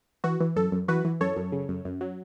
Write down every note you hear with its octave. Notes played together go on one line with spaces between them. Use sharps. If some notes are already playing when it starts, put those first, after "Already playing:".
E3 F#4
E3
F#2 A4
F#2
E3 F#4 B4
E3
F#2 A4 C#5
F#2
C#3
F#2
F#2
F#3